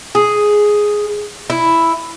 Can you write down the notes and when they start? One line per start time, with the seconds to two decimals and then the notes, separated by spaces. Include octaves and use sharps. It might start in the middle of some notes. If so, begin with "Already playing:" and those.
0.15 G#4
1.50 E4